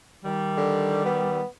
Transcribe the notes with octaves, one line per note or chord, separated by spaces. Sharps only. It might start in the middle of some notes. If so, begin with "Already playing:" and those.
D#3 G3
D3
B3